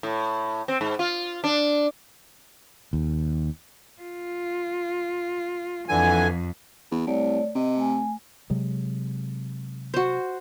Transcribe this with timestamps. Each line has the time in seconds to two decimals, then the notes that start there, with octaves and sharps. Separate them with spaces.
0.03 A2
0.68 C4
0.81 G#2
0.99 F4
1.44 D4
2.93 D#2
4.02 F4
5.89 F2 D3 E3 G#5
6.91 E2
7.07 C2 A3 C#5 D5
7.55 C3 D#5
7.76 A3 G#5
8.50 C3 F#3 G#3
9.94 F#4 C5